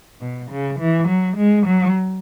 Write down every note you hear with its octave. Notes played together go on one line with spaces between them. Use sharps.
B2
C#3
E3
F#3
G#3
F#3